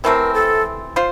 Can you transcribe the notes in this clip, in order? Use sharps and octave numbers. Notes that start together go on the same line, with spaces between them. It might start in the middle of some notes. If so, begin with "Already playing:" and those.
C3 E3 A3 C4 A#4
A4
F4 C5